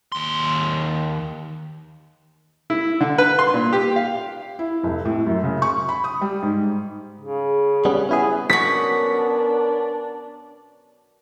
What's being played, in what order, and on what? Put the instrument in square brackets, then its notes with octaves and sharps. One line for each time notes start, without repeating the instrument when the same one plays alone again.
[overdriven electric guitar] D#2 C6
[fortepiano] E4
D3
B4
C6
A#2
G4
F5
[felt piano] E4
F1
A2
F#2
C#3
C#6
B5
D#6
G3
G#2
[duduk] C#3
[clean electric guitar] G3 B3 C#4
[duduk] B3 [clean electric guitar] C#4 E4 G#4
[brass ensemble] B3 C#4 A#4 [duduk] D4 [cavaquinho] F#4 A4 D#6 [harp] B6